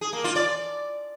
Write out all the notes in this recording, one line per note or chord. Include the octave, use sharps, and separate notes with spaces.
G#4
A#3
F4
D5